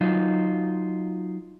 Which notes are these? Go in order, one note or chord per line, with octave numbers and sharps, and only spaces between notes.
F#3 D#4 F4